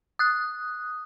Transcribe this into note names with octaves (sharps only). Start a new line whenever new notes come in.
D#6 F#6